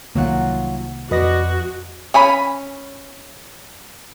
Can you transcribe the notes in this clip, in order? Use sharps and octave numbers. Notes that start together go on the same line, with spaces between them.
C2 D#3 F#3 A#3 F4 F#5
F2 F#4 B4 D5 D#5 A#6
C#4 G#5 B5